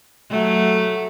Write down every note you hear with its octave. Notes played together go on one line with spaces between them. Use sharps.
F#3 A3